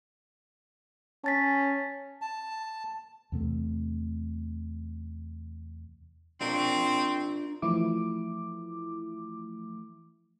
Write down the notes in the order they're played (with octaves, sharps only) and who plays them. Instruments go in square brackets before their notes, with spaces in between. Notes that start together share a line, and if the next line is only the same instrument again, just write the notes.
[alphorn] C#4 [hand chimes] A5 A6 B6
[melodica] A5
[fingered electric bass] E2 C3 A3
[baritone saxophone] C4 [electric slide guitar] D4 F4 A#4
[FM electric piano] E3 F3 A3 E4 D6